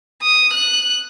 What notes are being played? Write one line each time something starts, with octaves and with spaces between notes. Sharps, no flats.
D#6
F#6